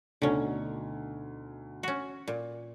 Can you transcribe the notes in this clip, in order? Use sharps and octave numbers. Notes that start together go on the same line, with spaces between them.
D2 B2 D3 C#4 D#4
C#4 F#4
A#2